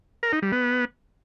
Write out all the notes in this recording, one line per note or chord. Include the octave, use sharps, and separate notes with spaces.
A#4
D#4
G3
B3